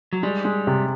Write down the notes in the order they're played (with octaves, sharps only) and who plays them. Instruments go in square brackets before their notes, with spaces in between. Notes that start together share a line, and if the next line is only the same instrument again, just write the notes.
[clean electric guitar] F#3
[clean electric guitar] G3 [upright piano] G#3
[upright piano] G#3
C3